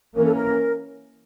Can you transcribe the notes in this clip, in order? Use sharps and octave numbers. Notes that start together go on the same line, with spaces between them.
E3 A#3 C#4 A#4
A4
A#4